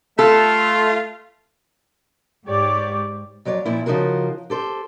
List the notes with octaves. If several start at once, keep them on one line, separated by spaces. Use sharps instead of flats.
A3 F4 A4
G#2 G4 C#5 D5
F2 F#3 C#5 D5
A#2 F3 E4
C#3 F3 D#4 F4 F#4 A#4
G4 A4 C5